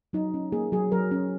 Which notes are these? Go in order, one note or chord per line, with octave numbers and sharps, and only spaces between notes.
F#3 D#4
C#4
A#3 G#4
F#3 G#4
F#3 A#4
C#4